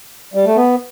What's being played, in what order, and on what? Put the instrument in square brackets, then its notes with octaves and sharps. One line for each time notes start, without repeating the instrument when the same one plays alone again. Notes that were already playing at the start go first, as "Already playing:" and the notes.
[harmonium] G3
A3
B3